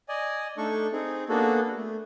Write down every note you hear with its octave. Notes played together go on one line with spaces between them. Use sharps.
D5 D#5 G#5
A3 D4 D#4 A4 C#6
C4 D#4 G#4
A#3 B3 D4 F#4 G#4 A4
A3